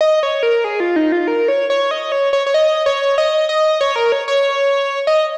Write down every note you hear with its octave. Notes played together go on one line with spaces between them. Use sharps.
D#5
C#5
A#4
G#4
F4
D#4
F4
A#4
C#5
C#5
D#5
C#5
C#5
C#5
D#5
C#5
D#5
D#5
C#5
A#4
C#5
C#5
D#5